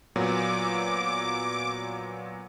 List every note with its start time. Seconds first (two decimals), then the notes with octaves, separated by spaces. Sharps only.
0.16 A#2 F#3 B3 D6